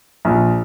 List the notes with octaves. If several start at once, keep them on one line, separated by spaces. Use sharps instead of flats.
A#1